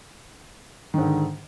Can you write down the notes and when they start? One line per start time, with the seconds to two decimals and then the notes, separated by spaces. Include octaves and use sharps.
0.94 D#3
0.98 G#2
1.02 D3